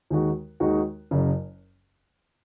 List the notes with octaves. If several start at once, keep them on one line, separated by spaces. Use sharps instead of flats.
D#2 D#3 G#3 D#4 F#4
D#2 D#3 G#3 D#4 F#4
F#1 F#2 C#3